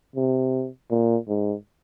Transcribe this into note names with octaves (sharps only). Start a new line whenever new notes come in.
C3
A#2
G#2